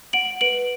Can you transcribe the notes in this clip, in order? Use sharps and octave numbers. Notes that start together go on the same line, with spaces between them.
F#5 D7 F#7
B4 D7 F#7